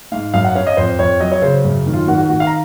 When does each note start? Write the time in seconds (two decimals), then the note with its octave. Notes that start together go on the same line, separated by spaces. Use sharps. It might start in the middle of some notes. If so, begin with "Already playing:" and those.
0.12 G#2 F5
0.34 F#2 F5
0.44 F#5
0.55 C#4 F5
0.67 D#5
0.77 F2 C5
0.99 F2 C#5
1.20 F#3 D#5
1.32 C#5
1.42 C#3 C5
1.64 F#2
1.86 D#3
1.93 F4
2.07 D#3 F#4
2.18 F#4
2.29 D#3 F#4
2.40 F5
2.47 A#5